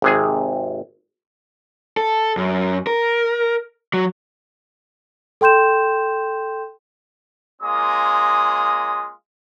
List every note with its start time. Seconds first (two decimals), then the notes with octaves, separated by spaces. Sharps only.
0.02 G#1 C3 G#4
1.97 A4
2.37 F#2
2.87 A#4
3.94 F#3
5.41 A4 G5 C6 G6 E7
7.61 G#3 A#3 C#4 F4 D#6